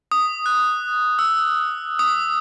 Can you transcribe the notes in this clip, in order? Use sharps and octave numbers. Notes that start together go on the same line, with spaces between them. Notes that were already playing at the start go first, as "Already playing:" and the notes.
D#6
F#6
E6
D#6